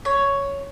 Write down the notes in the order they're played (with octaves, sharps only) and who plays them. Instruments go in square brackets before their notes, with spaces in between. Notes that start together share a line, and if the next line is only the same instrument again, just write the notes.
[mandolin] C#5